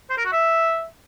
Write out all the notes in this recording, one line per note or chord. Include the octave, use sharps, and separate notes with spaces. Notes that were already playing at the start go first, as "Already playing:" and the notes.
C5
A#4
F#4
E5